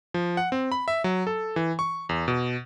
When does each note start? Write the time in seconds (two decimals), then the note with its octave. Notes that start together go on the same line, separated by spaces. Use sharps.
0.14 F3
0.37 F#5
0.52 C4
0.72 B5
0.88 E5
1.04 F#3
1.27 A4
1.56 E3
1.79 C#6
2.09 E2
2.28 B2